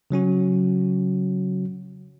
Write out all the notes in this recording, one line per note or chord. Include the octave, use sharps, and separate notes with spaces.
C#3 F#3 C#4 F#4